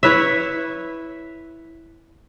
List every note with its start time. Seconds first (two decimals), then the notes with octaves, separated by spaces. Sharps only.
0.03 E4 B4 C#5 E5